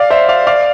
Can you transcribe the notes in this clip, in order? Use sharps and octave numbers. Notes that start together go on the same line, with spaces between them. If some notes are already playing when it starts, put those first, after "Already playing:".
Already playing: D5 F5
C5 E5
D5 F5
D5 F5